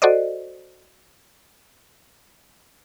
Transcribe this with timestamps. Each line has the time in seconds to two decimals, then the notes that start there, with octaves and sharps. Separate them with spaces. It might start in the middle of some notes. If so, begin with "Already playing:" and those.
0.02 F#4 A4 C5 D5 D#5